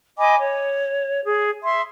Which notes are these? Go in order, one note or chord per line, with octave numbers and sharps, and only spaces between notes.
D#5 G#5 B5 D6
C#5
G#4
E5 C6